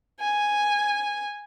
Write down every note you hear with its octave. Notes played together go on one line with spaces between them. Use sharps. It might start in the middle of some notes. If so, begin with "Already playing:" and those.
G#5